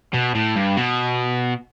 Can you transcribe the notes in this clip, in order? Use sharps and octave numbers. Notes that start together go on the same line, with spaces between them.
B2
A2
G2
B2